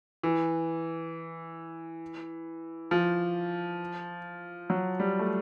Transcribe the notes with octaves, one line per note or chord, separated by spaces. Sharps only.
E3
F3
F#3
G3
A3